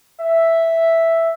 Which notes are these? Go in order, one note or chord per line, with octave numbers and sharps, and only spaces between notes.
E5